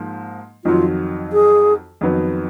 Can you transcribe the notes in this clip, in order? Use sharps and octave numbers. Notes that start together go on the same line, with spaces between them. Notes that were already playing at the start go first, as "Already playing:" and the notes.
Already playing: G#2 F3 A#3
F2 D#3 F#3 F4
G#4
F2 D#3 F#3 B3